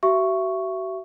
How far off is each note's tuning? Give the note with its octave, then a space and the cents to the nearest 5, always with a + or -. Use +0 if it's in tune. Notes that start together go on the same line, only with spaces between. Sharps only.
F#4 +40 E5 +25 C#6 +0